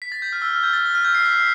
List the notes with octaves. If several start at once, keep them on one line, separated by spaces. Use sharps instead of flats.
B6
A6
G6
F6
E6
F6
G6
A6
F6
G6
C7
B6